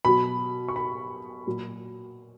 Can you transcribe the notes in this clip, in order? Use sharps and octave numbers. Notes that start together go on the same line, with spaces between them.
B2 F#3 B5
C#6
B5
A#2 F#3